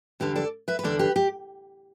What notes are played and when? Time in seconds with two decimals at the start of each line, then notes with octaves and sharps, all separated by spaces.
0.20 E2 D3 G3 D4 G4 B4
0.36 A4 D5
0.68 B4 E5
0.79 B4
0.83 E2 D3 G3 D4 A4 D5
0.99 G4 B4
1.16 G4